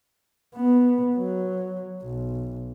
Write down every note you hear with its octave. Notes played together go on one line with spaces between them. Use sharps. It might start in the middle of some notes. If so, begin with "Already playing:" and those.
B3
F#3
B1